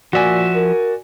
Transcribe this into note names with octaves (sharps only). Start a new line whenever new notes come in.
A#2 F3 F#4 D5 E5 G#5
A#4